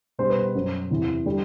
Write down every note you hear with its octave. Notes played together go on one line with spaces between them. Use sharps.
B2 G3 C5
B4
C5
F#2 F#3
E2 C3 E3
D3 G3